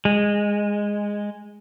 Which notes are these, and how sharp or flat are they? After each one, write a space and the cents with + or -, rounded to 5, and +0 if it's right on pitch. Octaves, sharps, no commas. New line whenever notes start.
G#3 -10